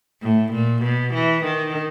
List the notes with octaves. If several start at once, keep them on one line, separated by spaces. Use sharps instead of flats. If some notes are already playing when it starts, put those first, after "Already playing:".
A2
A#2
B2
E3
D#3